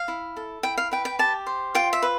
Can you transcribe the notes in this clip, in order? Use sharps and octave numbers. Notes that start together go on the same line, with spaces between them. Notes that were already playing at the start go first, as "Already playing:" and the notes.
Already playing: F5
E4
A4
E4 G5
F5
B4 G5
G5
G4 A5
C5
F4 G5
E5
B4